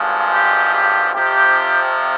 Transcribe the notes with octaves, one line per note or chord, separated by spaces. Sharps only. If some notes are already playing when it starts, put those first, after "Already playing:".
Already playing: G#1 G2 F3 G#3
G4
G4
F2 C3 F3 G4